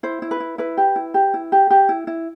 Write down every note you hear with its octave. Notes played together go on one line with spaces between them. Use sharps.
E4 C5
E4
B4
E4
E4 B4
G4
E4
G4
E4
G4
G4
E4
E4